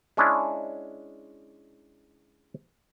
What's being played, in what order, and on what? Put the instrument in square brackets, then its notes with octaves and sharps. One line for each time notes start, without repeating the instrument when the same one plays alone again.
[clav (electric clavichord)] G#3 C#4 D4 E4